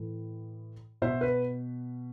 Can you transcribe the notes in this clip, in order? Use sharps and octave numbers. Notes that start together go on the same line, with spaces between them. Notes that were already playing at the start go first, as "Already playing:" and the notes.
Already playing: A2 E3
B2 C5 E5
B4